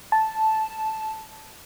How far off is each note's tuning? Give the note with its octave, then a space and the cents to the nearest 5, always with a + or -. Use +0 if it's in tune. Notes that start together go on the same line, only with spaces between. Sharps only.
A5 -5